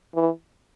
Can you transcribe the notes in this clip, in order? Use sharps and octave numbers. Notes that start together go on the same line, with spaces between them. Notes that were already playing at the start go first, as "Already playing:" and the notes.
E3